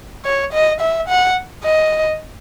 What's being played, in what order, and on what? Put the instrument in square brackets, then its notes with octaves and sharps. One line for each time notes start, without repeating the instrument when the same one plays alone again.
[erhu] C#5
D#5
E5
F#5
D#5